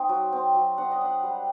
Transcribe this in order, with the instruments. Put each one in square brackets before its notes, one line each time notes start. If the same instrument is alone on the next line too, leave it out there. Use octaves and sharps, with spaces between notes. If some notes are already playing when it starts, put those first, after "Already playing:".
Already playing: [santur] C4 D#4
F#3
C4
F#3
D4 F#5
D#5
D4 F#5
G3